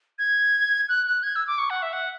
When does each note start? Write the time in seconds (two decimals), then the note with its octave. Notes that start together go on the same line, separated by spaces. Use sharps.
0.18 G#6
0.89 F#6
1.07 F#6
1.23 G#6
1.35 E6
1.47 D6
1.58 C#6
1.70 F#5
1.82 E5
1.93 F#5